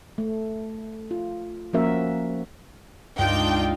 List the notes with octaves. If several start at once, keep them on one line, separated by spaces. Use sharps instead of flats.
A3
F4
F3 A#3 C#4 F#4 A#4 E5
C#2 G2 G#3 D4 D#4 F4 G5